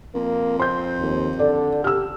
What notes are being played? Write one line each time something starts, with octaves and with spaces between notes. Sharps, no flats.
F2 A#3
C4 C6 G6
D#2
D3 A4 D5
G4 E6 F6